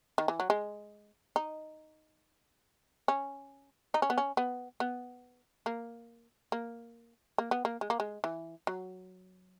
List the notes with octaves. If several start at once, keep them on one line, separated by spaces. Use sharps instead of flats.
D#3
E3
F#3
G#3
D#4
C#4
D#4
C#4
B3
C#4
B3
B3
A#3
A#3
A#3
B3
A#3
G#3
A#3
G#3
E3
F#3